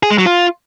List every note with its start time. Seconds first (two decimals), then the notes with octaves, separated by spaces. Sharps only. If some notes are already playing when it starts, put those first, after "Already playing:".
0.03 G#4
0.11 G#3
0.18 F#3
0.26 F4